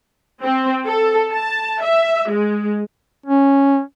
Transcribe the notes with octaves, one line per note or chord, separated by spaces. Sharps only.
C4
A4
A5
E5
G#3
C#4